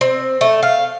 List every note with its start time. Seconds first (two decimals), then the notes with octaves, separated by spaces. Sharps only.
0.01 C4
0.41 A3
0.63 F5